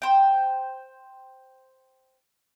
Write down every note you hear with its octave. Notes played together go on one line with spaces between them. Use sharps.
C5 G5